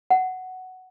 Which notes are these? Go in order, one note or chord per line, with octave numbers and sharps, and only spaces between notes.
F#5